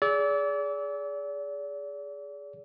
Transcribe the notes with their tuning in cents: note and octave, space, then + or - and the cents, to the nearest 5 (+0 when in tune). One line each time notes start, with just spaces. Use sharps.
G#4 +0 D5 -35 E6 -20